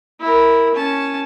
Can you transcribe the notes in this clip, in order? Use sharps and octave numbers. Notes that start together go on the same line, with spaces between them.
E4 A#4
C#4 A5